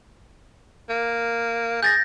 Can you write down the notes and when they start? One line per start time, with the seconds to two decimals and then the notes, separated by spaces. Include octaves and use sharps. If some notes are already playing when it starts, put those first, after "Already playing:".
0.89 A#3
1.83 G#4 G6 A6 A#6